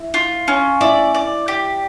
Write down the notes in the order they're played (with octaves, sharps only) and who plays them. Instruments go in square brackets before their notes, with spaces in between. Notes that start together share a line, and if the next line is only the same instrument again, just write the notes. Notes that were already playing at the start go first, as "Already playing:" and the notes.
Already playing: [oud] E4
[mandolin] F4
C#4
[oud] E4 [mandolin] D5
[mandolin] D5
G4